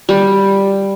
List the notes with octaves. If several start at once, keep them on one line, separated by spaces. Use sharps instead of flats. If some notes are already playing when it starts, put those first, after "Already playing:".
G3